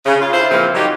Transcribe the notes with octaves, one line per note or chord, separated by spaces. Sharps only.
C#3
F4
D4 E4 F4 A4 C5
A#2 C#3 E3 F3 A#3 C4
F#3 G3 D#4 F4 G4